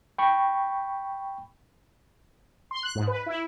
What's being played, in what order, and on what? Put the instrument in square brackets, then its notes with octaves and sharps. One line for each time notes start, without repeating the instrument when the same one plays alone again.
[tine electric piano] G5 B5 C#6
[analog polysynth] C6
F#6
G#2
B4
E4